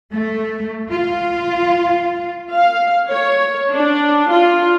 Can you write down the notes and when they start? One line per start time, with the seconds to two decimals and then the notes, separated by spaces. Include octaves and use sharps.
0.12 A3
0.91 F4
2.54 F5
3.10 C#5
3.74 D4
4.32 F4